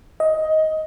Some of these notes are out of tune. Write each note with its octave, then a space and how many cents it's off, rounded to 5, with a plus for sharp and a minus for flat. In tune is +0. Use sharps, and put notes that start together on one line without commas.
D#5 +15